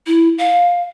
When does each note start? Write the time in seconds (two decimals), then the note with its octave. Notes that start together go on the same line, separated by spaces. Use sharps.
0.07 E4
0.38 F5